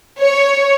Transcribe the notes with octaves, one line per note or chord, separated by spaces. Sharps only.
C#5